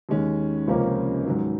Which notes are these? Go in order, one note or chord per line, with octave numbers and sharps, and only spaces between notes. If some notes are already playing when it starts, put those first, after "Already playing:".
D#2 D#3 G#3 C#4
C#2 C3 F3 A#3 C#4
G#2 D#3 F#3